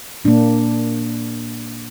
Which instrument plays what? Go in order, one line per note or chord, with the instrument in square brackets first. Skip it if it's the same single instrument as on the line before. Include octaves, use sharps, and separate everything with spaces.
[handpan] A#2 A#3 D4